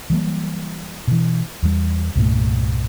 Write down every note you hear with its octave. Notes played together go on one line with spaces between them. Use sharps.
E3 F#3 G3 A#3
B2 E3
E2 G3
C2 G2 A#2 A3